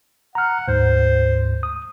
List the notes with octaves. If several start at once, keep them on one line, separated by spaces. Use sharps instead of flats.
F#5 A#5 F6
D2 G#2 C5
D#6